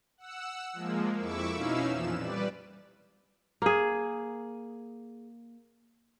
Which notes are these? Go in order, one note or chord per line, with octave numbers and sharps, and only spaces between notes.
F#5 E6
F3 G#3 A#3
F2 E4 C#6 D6 E6
B2 C#4 D#4 E4 F5 E6
F2 A#2 E3 F3 E7
G3 B4 D5
A#3 G#4